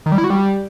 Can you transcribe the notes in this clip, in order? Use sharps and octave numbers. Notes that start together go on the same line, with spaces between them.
D#3
G3
E4
F#4
G3